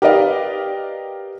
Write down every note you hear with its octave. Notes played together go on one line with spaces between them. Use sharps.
G4 A#4 B4 D5 D#5 F5